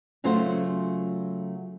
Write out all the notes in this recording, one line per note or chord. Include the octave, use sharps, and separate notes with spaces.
C#3 F#3 A3 F4 F#4 C5